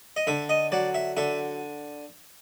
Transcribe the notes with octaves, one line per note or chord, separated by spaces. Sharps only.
D#5
D3 E5
D#5
F#3 D5
E5
D3 E5